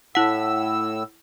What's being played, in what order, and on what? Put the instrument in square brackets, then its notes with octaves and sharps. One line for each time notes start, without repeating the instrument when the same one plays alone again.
[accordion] A2 E6 [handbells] E4 F#5